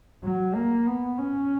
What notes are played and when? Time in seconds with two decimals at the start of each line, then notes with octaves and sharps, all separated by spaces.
0.24 F#3
0.55 A#3
0.86 B3
1.18 C#4